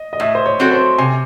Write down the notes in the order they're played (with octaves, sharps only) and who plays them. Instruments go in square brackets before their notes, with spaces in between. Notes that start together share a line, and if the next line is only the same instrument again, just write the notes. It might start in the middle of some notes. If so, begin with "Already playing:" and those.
Already playing: [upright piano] D#5
D#5
[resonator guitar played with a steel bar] A2 [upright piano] E5
[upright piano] C5
C#5
[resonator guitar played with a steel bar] F#3 C4 F#4 A4
[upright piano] C5
[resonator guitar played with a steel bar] C3 [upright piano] G#5